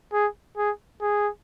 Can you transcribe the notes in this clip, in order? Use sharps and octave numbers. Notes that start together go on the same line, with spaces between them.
G#4
G#4
G#4